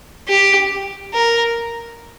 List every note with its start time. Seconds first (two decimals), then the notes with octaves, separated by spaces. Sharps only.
0.28 G4
1.14 A#4